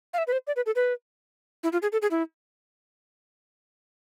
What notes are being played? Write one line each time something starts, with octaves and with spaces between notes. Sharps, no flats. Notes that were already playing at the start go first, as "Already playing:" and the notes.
F5
E5
B4
C5
D5
B4
A4
B4
E4
F4
G#4
A4
G#4
E4